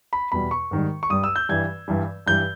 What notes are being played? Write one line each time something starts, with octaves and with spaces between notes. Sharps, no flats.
B5
E2 B2 G3 B5
C#6
G#2 D#3 G3
C#6
G2 G3 D#6
E6
G6
G2 E3 G3 G#6
G2 E3 G3
G2 E3 G3 G6